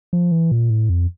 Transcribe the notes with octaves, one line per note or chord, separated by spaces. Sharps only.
F3
E3
A#2
A2
F2